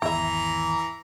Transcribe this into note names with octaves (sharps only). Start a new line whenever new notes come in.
G#1 E2 E3 E4 E5 A#5